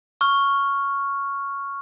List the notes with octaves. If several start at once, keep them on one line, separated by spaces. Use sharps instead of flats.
C#6 F6